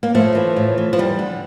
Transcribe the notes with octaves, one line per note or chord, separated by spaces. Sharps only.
A#3
A2 F3 A3
E3
A2
E3
F3
E2 G3
D3